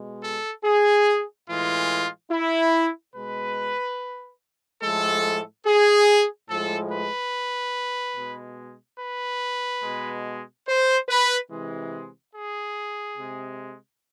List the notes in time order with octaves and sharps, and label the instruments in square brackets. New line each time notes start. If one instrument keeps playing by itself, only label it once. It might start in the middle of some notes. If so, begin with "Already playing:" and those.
Already playing: [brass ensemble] B2 G#3
A4
G#4
A2 E3 G#3 F4
E4
B2 G#3 B4
A2 F3 G#3 A4
G#4
A2 F3 G#3 A4
B4
B2 G#3
B4
B2 G#3
C5
B4
C3 E3 G#3
G#4
C3 G#3